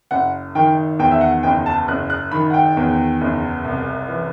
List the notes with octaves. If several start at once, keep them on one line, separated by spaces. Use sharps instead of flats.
F#1 F#5
D#3 G5
E2 G5
E5
F#5
F#1 G5
A5
F#1 F#6
F#6
D#3 B5
F#5
G5
E2
F#1
C2
E3